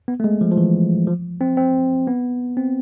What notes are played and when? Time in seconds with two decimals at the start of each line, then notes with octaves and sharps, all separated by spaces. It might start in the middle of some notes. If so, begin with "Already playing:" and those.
0.08 B3
0.20 A3
0.24 G#3
0.41 F3
0.51 F3
0.57 E3
1.07 F3
1.41 C4
1.57 C4
2.07 B3
2.57 C4